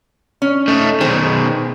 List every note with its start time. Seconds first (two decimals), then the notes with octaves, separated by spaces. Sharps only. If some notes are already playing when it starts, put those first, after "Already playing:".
0.42 C#4
0.68 A3 D#4
1.01 B2 D#3 G#4 C5